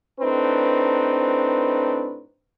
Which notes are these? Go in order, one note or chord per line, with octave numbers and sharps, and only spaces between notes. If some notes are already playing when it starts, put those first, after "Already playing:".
A2 C4 D4 D#4 B4